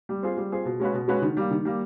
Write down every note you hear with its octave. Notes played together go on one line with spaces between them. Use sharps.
G3
C4 F4 G#4
G3
C4 F4 G#4
B2
G#3 C#4 F#4 B4
B2
G#3 C#4 F#4 B4
D#3
G3 A#3
D#3
G3 A#3